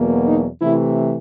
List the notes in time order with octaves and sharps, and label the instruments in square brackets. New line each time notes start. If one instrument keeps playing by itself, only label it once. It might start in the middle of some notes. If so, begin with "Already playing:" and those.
Already playing: [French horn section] E2 B2 F#3 A#3
D#4
C3 E3 A3 E4